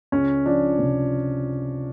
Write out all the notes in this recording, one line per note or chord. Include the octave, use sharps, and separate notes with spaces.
C#2 C#4
F3 D4
C3